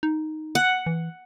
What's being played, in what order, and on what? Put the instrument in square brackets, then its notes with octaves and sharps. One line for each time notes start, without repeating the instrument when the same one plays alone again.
[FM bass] D#4
[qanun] F#5
[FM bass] E3